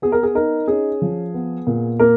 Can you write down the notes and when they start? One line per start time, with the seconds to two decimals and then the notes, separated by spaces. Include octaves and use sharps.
0.02 B3 G#4
0.12 A#4
0.23 G#4
0.35 D#4 A#4
0.68 C#4 G#4
1.02 F3
1.34 B3
1.67 A#2
2.00 A#3 A#4